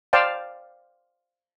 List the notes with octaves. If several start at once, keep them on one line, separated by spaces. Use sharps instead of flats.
C5 D5 F5 G5 A5